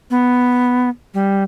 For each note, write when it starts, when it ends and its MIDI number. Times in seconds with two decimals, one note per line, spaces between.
0.11 0.89 59
1.14 1.43 55